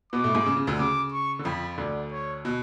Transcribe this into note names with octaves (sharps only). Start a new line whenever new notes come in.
B2 B3 D6
A2 A3
G#2 G#3
C#3
C#3
D2 D3
C#3 D6
C#6
D3
F2 F3 B5
D2 D3 D5
C#5
B2